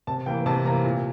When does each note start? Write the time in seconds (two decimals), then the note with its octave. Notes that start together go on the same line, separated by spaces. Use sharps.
0.07 C3 A5
0.26 E3 A#3 G5
0.46 C3 A5
0.65 E3 A#3 A#5
0.84 A#2